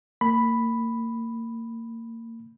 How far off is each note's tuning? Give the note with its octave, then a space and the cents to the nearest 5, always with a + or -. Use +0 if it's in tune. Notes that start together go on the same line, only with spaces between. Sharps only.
A#3 -30 B5 +0